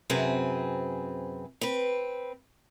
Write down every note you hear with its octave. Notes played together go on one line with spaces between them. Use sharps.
F#2 C3 C4 G#4 B4
C4 B4